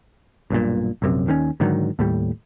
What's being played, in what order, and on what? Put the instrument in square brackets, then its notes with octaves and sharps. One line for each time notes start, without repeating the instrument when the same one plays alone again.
[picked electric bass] B1 G2 A#2
A#1 F#2 C3
D#2 D#3 A#3 C#4
G#2 D3 D#3 F#3
D#2 A2 G3